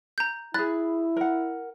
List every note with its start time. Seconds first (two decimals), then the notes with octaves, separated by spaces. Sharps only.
0.18 A#5 G6
0.54 E4 G#4 B5 F#6 A6
1.16 A#4 F#5